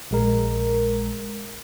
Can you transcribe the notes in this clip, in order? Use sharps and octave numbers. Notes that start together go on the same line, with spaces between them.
A#1 G#3 A#4